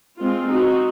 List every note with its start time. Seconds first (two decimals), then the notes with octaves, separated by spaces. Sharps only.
0.19 G#3 C4 F4
0.48 C4 D#4 F#4